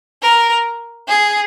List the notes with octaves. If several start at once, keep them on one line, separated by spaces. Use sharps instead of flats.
A#4
G#4